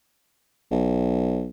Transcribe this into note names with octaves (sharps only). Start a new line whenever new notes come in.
B1